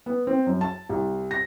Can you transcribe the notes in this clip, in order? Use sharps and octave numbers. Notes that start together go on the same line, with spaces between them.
B3
C4
F#2
A5
C2
A#6